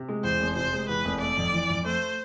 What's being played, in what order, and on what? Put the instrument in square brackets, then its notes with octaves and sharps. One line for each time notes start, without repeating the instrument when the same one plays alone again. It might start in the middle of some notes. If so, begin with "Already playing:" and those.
Already playing: [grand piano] C3
G#3
[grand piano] E2 [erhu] C5
[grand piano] F1
[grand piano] C3 [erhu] C5
[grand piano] G#3
[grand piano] E2 [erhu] B4
[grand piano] F1
[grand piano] A3 [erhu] D5
[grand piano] F2
E3
F2
[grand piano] A3 [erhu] C5